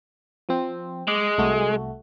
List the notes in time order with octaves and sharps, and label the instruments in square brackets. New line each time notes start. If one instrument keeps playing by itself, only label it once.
[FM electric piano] F3 C4
[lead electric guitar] G#3 [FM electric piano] D6
[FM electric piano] C2 A3 F#4